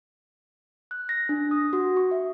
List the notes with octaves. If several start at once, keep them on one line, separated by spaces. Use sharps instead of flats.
F#6
A#6
D4
D#6
F#4
C#6
E5